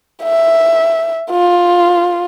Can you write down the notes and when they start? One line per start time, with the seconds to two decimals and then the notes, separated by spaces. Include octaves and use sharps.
0.23 E5
1.31 F4